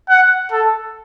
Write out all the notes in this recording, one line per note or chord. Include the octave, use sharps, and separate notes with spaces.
F#5
A4